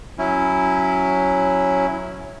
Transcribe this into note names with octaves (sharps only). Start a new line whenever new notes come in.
F#3 C#4 E4